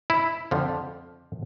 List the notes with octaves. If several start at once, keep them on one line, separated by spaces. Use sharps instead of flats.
E4
F2 D3 F3